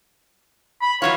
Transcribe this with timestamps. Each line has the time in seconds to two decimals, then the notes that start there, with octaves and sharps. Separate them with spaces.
0.81 B5
1.02 E3 F#3 F4 C#5